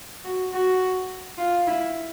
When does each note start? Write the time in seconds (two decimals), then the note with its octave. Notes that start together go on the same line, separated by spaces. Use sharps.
0.24 F#4
0.53 F#4
1.38 F4
1.67 E4